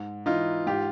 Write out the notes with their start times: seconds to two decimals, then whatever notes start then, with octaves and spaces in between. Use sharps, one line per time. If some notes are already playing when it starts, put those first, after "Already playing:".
Already playing: G#2
0.26 E3 D#4 F4
0.66 G#2 F4 G4